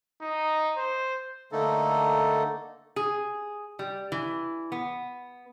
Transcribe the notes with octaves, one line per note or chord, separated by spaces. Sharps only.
D#4
C5
D3 A3 A#3 D#4 A4
G#4
G3
E3
B3